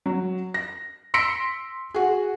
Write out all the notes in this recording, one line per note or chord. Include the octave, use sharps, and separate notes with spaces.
F#3
A#6
C6 E6 A#6 B6 C#7 D7
F#4 G#4